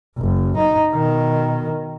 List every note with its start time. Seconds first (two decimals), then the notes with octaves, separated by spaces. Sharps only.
0.18 F#1
0.57 D#4
0.92 B2 D#3